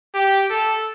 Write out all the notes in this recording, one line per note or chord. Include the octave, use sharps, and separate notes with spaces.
G4
A4